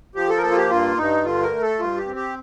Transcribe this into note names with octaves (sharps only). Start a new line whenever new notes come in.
F3 G4
A4
A#4
A#3 A4
F4
G4
G2 F4
G2 D#4
D3 F4
A#4
A3
A4
G2 F4
G4
C4
G4